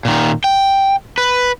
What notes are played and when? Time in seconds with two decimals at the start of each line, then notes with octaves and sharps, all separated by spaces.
0.05 A#2 D#3
0.44 G5
1.18 B4